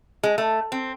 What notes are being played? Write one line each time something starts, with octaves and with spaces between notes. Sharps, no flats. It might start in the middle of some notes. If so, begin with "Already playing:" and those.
G#3
A3
C4